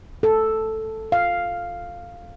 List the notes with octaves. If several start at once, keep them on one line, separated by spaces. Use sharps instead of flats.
A4
F5